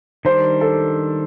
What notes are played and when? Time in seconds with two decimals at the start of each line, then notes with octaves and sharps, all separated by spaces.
0.25 D#3 G3 D4 C5
0.61 A4